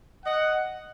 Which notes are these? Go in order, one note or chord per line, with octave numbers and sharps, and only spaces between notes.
D#5 F#5